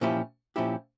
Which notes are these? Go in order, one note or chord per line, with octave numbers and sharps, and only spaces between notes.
A#2 F3 C#4 E4 G4
A#2 F3 C#4 E4 G4